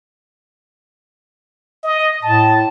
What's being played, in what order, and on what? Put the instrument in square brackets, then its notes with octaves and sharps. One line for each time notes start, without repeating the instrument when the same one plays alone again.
[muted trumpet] D#5
[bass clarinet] A2 [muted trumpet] A5